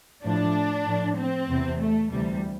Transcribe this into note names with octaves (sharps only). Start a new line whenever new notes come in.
A2 F3 D4
A2 F3
C4
E2 C3 E3
A3
D2 C3 E3 G3